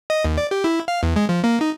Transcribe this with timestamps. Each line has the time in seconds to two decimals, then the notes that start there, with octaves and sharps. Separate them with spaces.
0.10 D#5
0.25 D#2
0.38 D5
0.51 G4
0.64 E4
0.88 F5
1.03 E2
1.16 G#3
1.29 F3
1.44 A#3
1.61 D#4